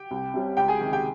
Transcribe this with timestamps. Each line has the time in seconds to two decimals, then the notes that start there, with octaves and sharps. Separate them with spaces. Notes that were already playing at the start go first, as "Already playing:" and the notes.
Already playing: G4 G5
0.11 C2
0.34 C3 G3 C#4
0.57 C#2 G4 G5
0.68 G#4 G#5
0.80 C3 D#3
0.93 G4 G5